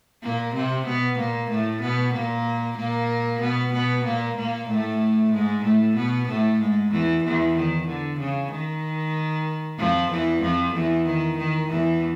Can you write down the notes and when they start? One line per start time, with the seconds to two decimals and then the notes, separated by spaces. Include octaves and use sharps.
0.22 A#2 A#3
0.54 C3 C4
0.86 B2 B3
1.18 A#2 A#3
1.49 A2 A3
1.82 B2 B3
2.13 A#2 A#3
2.77 A#2 A#3
3.41 B2 B3
3.73 B2 B3
4.04 A#2 A#3
4.36 A#2 A#3
4.68 A2 A3
5.32 G#2 G#3
5.64 A2 A3
5.95 B2 B3
6.28 A2 A3
6.60 G#2 G#3
6.91 E2 E3
7.23 E2 E3
7.56 D#3
7.87 D3
8.19 C#3
8.51 D#3
9.78 F2 F3
10.10 E2 E3
10.42 F2 F3
10.74 E2 E3
11.06 D#3
11.38 D#3
11.69 E2 E3